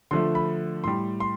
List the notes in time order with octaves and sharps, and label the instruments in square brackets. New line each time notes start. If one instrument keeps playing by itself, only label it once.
[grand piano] D3 F3 A3 C6
B5
A2 G3 C6
C6